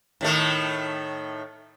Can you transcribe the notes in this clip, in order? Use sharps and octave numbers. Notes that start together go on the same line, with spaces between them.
A2 D#3 A3